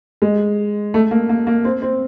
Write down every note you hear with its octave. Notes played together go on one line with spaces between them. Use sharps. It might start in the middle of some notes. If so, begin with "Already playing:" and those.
G#3
A3
A#3
A#3
A#3
C4
C4